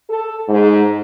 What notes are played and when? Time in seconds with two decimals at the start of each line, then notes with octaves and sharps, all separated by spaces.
0.10 A4
0.48 G#2